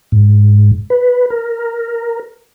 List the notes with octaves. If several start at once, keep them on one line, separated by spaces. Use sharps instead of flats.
G#2
B4
A#4